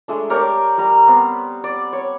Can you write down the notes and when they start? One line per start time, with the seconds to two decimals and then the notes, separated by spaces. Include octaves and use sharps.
0.08 G#3 A3 D4
0.30 G4 A#4 C#5 D5
0.78 G3 A#5
1.08 B3 C4
1.64 D5
1.93 C#5